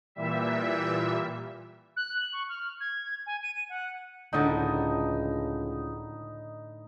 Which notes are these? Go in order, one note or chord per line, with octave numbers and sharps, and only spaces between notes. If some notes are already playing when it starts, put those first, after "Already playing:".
A#2 E3 G3 E5
F#6
F#7
C#6
F6
G#6
G#5
D#7
D#7
F#5
C#2 A2 D3 D#4 A5